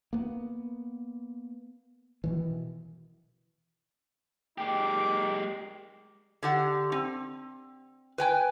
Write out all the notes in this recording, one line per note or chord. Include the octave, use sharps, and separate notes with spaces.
A#3 B3
B2 D#3 E3
G#3 A#3 D#4 G4 D6
D3 G4 F#5
C4
B4 G5 G#5